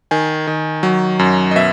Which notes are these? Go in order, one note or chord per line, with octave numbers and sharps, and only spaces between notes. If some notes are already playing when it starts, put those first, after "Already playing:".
D#3 G#5
D#3
F#3
F#2
D#5
B2 E5